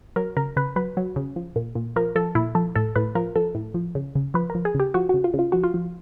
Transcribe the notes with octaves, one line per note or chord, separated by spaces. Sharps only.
F#3 A#4
C#3 A#4
C#3 B4
F#3 B4
F#3
C#3
F3
A#2
A#2
F3 A#4
F3 A4
A#2 E4
F3 A4
A2 A4
A2 B4
F3 A#4
F3 A4
A2
F3
C#3
C#3
F3 B4
A#4
F3
G#4
C#3
G4
F3 F#4
C#3 F#4
F4
C#3
F4
F3 F#4
F4
F3